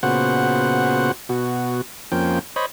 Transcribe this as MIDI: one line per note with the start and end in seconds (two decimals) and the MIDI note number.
0.03 1.12 46
0.03 1.12 49
0.03 1.12 59
0.03 1.12 66
0.03 1.12 72
0.03 1.12 78
1.29 1.81 47
1.29 1.81 66
2.12 2.39 41
2.12 2.39 53
2.12 2.39 58
2.12 2.39 61
2.12 2.39 79
2.56 2.66 72
2.56 2.66 73
2.56 2.66 75
2.56 2.66 83